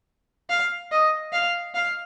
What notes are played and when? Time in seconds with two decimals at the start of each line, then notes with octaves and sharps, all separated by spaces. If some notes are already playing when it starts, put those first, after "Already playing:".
0.50 F5
0.91 D#5
1.33 F5
1.75 F5